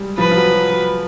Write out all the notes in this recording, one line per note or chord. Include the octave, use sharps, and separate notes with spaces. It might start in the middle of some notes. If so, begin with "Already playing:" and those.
Already playing: G3 G#3
F3 B4
F3
F#3
F#3
F#3